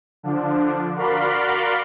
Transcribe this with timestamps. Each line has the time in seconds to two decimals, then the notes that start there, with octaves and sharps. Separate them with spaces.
0.23 D3 F3 D4
0.96 F#4 A#4 D5 F5 B5 C6